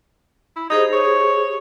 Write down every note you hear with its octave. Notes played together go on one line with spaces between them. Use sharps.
E4
D#4 G4 G#4 C5
C#5